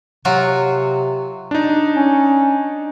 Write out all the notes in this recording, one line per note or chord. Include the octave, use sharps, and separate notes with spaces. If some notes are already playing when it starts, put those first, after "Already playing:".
C3 F#3 F4 F#4
D4 D#4
C#4